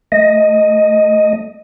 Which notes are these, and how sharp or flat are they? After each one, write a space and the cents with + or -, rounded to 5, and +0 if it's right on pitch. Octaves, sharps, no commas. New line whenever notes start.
A3 +0 D#5 +0